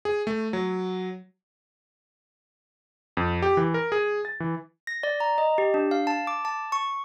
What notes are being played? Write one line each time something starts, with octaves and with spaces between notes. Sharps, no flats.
G#4
A3
F#3
F2
G4
E3
A#4
G#4
A6
E3
A#6
D5
A#5
D#5
G4
D4
F5
A5
D6
A5
C#6